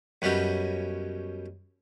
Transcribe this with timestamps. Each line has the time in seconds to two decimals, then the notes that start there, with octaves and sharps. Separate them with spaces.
0.22 F#2 B2 G3 C#4